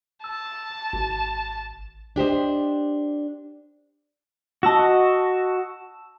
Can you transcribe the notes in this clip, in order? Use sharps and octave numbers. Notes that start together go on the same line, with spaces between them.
A5 E6
G#1
D4 G4 C5 D#5
F#4 D#5 A5 E6 E7